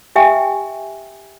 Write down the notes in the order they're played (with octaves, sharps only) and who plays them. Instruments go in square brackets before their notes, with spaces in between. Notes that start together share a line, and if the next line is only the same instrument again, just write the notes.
[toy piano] G4 E5 G5 G#5